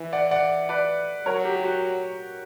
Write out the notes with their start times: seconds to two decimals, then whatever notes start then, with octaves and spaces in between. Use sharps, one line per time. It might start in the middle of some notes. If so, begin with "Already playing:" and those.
Already playing: E3
0.13 D5 F#5
0.31 D5 F#5
0.69 B4 D5
1.26 F#3 A#4 C#5
1.45 G4
1.55 G4
1.64 F#4